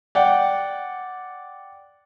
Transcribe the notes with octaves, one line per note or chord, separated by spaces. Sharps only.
D5 F#5 G5